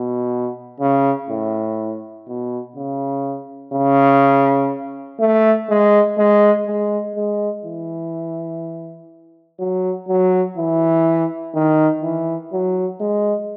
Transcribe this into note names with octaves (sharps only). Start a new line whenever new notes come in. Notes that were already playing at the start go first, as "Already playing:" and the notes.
Already playing: B2
C#3
A2
B2
C#3
C#3
A3
G#3
G#3
G#3
G#3
E3
F#3
F#3
E3
D#3
E3
F#3
G#3